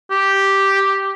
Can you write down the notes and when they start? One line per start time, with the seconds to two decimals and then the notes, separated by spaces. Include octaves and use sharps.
0.11 G4